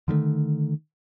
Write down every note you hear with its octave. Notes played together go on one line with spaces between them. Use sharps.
D3 D#3 G3 A3